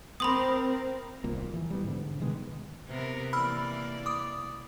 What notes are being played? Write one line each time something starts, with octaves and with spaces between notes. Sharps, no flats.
C4 A#4 B5 C6 D#6
D#1 C2 A#2 A#3
E3
G3 B3
G#2 D3
C3 D#3 G#3 B3
C3 B3 A#4
E3 A#3 D5 B5 E6 F6
D6 D#6